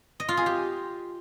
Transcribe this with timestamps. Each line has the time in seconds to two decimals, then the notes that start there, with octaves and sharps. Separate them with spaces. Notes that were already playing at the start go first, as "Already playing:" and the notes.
0.20 D#5
0.29 F4
0.37 G#4
0.46 G4